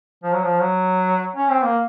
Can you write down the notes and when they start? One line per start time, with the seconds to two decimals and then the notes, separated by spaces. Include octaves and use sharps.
0.23 F3
0.33 F#3
0.44 F3
0.61 F#3
1.37 C#4
1.51 C4
1.64 A#3